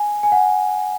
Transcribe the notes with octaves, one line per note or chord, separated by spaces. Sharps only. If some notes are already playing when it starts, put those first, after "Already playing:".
Already playing: G#5
G#5
F#5